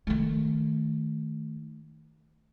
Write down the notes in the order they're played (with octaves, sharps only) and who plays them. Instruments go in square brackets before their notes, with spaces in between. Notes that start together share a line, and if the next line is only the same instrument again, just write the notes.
[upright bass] D#3 A3